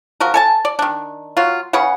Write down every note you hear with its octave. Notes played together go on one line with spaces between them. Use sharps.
F3 F#4 A#4
A4 G#5 A5
D5
D#3 D4
F#3 F4
C#3 G#4 B4 F#5